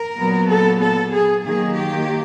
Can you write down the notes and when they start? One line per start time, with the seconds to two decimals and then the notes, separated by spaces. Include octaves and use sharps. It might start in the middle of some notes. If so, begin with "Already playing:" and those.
Already playing: A#4
0.19 A#2 F#3 B3
0.51 A4
0.82 A4
1.13 G#4
1.45 D#3 F#3 A#3 G#4
1.76 G4